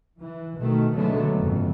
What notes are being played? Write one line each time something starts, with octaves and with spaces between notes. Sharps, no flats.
E3
B2 D#3 A3
D3 F#3 G#3 A3 B3
F#1 F2 G#2